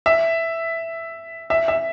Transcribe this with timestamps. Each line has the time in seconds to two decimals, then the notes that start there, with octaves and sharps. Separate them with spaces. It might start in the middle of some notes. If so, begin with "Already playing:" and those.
0.06 E5
1.50 E5
1.68 E5